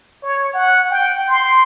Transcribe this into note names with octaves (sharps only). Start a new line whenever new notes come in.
C#5
F#5
G5
C6